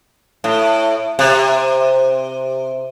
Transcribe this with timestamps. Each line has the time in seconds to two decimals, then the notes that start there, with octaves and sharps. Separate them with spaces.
0.44 A2
1.19 C3